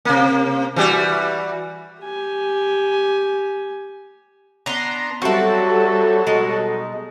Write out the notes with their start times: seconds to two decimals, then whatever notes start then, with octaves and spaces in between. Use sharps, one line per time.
0.05 C3 A#3
0.76 E3 G3 F#4
2.02 G4 G#5
4.66 B3 D4 A#5 C6
5.22 F#3 G3 C4 E4 F#4 A4 A5
6.27 B2 G#3 D#4